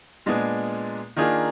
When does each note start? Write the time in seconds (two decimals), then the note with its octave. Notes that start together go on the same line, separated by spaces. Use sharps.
0.26 A#2 G#3 B3 D4 G#4
1.16 D#3 A#3 D4 F4 G#4